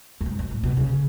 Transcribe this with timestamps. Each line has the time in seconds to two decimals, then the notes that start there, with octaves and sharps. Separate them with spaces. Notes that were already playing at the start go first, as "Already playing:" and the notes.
0.21 F#2
0.26 G#2
0.39 F#2
0.51 A2
0.63 B2
0.77 C#3